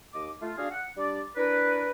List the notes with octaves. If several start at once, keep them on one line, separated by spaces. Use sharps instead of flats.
D#2 D#5 D6
A3 F4
D4 F#4 G#4 F5
F#5
G3 D4 D5
D4 E4 A#4 B4